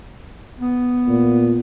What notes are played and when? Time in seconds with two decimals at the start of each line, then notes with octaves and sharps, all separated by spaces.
0.59 B3
1.08 A#2